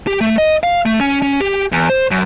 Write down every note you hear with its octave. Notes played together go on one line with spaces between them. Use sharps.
G4
A3
D#5
F5
A3
C#4
C#4
G4
E2
C5
F#2